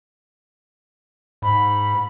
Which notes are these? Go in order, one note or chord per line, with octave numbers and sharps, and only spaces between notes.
G#2 B5